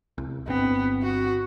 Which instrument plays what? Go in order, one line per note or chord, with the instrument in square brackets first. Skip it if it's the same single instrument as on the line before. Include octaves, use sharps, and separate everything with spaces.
[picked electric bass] C2
[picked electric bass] G1 C4 [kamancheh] B3
[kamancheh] F#4